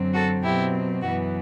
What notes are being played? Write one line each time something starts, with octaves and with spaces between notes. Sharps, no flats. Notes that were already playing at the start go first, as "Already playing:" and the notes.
Already playing: F#2 D3 F#3 C4
F#4 A4
B2 F#3 C4 E4 G4
F#2 E3 B3 F#4